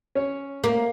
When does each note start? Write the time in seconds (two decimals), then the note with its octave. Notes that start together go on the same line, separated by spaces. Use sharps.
0.15 C#4 C#5
0.64 A#3